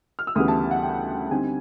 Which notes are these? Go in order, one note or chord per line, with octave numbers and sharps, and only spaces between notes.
F6
E6
D2 C#3 E3 G3 B3 D#6
A5
F#5
G5
A5
D3 G3 C4 D#4 G#5